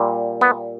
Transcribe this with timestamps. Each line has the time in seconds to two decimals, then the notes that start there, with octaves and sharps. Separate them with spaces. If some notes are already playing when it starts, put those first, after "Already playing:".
Already playing: A#2 G3
0.41 B3